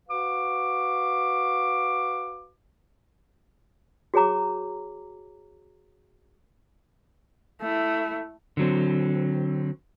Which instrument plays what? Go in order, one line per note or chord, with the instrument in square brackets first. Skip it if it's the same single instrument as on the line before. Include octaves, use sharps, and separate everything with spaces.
[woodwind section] F#4 B4 F5 D6
[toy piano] F#4 G#4 C#5 A#5 D6
[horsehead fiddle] A3 E4
[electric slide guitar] D3 F#3 C4